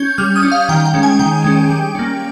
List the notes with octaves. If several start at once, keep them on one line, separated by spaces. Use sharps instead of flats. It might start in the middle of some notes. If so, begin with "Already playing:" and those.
Already playing: C#4 G6 G#6
G3 F6
D#6
C#4
F5
D#3 G5
G5
G#3 C#4
G#5
D#3 G5
G#3 C#4
G3
A#3 C#4